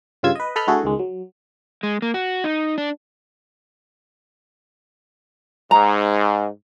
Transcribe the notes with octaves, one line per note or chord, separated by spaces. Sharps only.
G2 C#3 F4 E6 G#6
B4 D#5
A4 B4 D#5 B5 F6 G6
D3 A3 E4 F#4 G#4 A4
C#2 D#3 G#3
F#3
G#3
A#3
F#4
D#4
D4
G#2 A#5